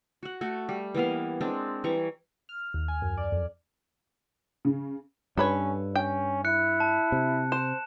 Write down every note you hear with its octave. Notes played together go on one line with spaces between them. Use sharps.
F#4 F#5
A3 F#4
G3
E3 A#3 B3 F5
G#3 C4 D4
E3 G3 A#5 C#6
F6
D#2
G#5
F#2
D5
F2
C#3
G2 C#4 A4 B4 C#5
C#4 G5
E4 F#6 C#7
A5
C3
C5 E7